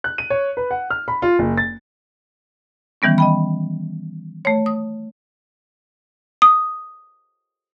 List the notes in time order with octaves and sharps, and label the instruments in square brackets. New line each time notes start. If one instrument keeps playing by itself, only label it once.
[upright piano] F#6
D#7
C#5
B4
F#5
F6
B5
F4
F#1
A6
[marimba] D#3 E3 G3 B3 C#4
D#5 G5 B5
A3 C#5
D#6
[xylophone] D#6